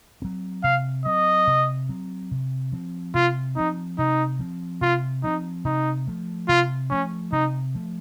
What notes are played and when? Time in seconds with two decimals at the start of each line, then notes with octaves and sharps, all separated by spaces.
0.22 F#3 C4
0.63 C3 F5
1.05 F#3 C4 D#5
1.47 C3
1.89 F#3 C4
2.31 C3
2.72 F3 C4
3.14 C3 F4
3.56 F3 C4 D#4
3.98 C3 D#4
4.39 F3 C4
4.81 C3 F4
5.23 F3 C4 D#4
5.65 C3 D#4
6.07 F3 A3
6.48 C3 F4
6.90 F3 A3 C#4
7.32 C3 D#4
7.75 F3 A3